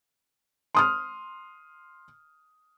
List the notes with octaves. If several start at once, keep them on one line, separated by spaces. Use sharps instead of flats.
C6 D#6 F6